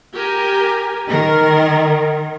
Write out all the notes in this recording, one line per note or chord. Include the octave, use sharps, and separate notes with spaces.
G4 A#4 G#5
D#3 A#4